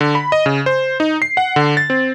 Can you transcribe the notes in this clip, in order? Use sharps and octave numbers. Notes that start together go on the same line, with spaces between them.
D3
B5
D#5
C#3
C5
D#4
C7
F#5
D3
A6
C4